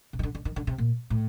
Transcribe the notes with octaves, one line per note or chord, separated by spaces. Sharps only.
C3
D#3
D3
D3
D#3
D3
C3
A#2
A2